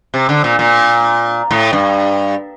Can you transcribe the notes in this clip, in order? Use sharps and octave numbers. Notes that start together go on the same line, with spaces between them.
C3
D3
A#2
A#2
A2
G2